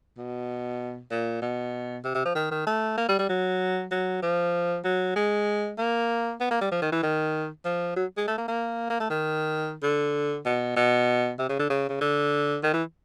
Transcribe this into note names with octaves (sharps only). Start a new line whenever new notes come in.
B2
A#2
B2
C3
C3
F3
D#3
D#3
A3
A#3
G3
G3
F#3
F#3
F3
F#3
G#3
A#3
B3
A#3
G3
F3
D#3
E3
D#3
F3
F#3
G#3
A3
A#3
A#3
A#3
A3
D#3
D3
B2
B2
C3
C#3
D3
C#3
C#3
D3
D#3
E3